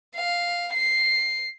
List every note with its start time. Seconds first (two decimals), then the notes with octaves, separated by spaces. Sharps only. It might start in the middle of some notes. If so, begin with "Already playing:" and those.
0.16 F5
0.74 C7